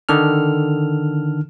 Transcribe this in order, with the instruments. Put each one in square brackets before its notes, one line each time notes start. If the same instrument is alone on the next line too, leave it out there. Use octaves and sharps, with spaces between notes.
[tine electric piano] D3 D#3 A4 F6